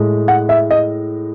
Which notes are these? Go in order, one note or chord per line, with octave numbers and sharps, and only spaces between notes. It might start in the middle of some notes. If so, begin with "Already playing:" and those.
Already playing: A2 G#3
F#5
E5
D#5